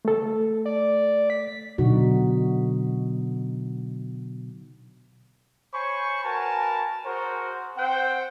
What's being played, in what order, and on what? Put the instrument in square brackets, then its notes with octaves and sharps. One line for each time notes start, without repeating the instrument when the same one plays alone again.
[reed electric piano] A3 A4
[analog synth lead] D5
B6
[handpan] B2 D3 F#3 D#4 F#4
[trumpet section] C5 C#5 G#5 B5 C#6
F#4 A#4 B4 G#5 A5
F#4 G#4 A#4 C5
C4 C5 F#5 G5